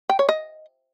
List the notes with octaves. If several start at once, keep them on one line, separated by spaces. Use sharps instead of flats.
G5
C#5
D#5